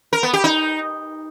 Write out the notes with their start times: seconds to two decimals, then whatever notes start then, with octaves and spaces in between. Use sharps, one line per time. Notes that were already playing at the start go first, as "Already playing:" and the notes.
0.13 A#4
0.23 B3
0.33 G4
0.44 D#4